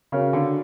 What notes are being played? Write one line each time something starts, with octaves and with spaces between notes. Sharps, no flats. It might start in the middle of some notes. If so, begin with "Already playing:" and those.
C#3 F#4 A#4 C#5 F5
D3